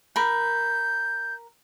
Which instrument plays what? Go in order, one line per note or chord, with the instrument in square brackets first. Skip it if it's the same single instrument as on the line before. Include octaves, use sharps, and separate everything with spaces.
[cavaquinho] A#4 B5 [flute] G6